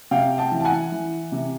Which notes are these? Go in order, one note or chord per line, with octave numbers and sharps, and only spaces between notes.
C3 F5 G5
G5 A5
E3
A5
F#5 G#5
E3
C3